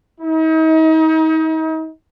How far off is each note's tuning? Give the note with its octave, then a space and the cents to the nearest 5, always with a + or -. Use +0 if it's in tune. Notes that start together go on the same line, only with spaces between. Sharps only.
D#4 +40